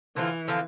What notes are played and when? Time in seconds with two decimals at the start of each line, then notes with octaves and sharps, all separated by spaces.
0.16 D3 E3 F3 C4 F4
0.48 D3 F3 C4 F4